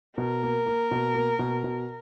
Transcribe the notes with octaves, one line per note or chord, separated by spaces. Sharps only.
B2 A#4
A#3
A#3
B2
A#3
B2
B2